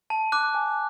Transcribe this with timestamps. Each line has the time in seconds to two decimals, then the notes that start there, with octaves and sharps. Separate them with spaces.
0.10 A5
0.32 D6 F#6
0.55 G#5